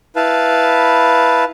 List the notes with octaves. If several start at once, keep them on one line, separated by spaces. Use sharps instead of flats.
E4 B4 F5 A5